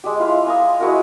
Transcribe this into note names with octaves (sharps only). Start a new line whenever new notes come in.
G#3 G4
E4 F4 F5
G#5 A#5 D#6
G#3 E4 F#4 A#4